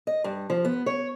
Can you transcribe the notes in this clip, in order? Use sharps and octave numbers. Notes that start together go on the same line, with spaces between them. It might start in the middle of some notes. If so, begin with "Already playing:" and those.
D#5
G2
F3
B3
C#5